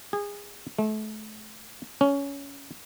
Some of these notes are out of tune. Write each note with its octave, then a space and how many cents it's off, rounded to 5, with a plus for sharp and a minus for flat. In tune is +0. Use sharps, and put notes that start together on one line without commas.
G#4 -25
A3 -35
C#4 +15